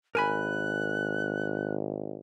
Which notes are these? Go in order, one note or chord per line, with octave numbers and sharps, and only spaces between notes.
G#1 A#4 G#5 B5 F#6